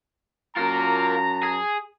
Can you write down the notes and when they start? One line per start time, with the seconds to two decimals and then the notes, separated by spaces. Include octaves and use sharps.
0.57 F#2 F4 A#4 A5 A#5
1.43 G#4